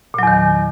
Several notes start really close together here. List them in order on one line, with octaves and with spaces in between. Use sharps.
A#2 F#3 E2 D#3